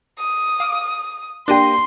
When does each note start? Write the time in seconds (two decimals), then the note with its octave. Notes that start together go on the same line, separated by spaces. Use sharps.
0.19 D#6
0.60 F5 D6 D#7
1.48 A#3 D4 G4 G5 C6 A#6 D#7